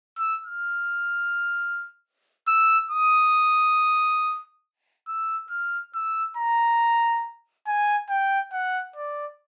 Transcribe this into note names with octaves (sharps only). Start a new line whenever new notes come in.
E6
F6
E6
D#6
E6
F6
E6
A#5
G#5
G5
F#5
D5